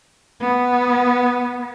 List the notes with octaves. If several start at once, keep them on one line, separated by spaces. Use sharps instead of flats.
B3